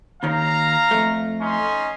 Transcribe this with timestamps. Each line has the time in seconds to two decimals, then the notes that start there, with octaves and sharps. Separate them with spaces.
0.23 D#2 D#3 C#5 F5 A#5
0.91 F2 A3
1.41 C#4 D#4 C6